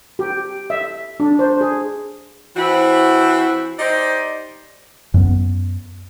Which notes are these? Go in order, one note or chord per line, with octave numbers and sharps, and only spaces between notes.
G4
E5
D4
C5
G#4
E3 C4 E4 F#4 C5
D#4 G4 C5 D5 D#5
F#2 B3